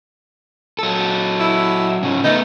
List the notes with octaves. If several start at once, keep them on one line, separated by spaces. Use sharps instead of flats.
F#3 A4
E4
G#2 C#3
A3 B3 D#4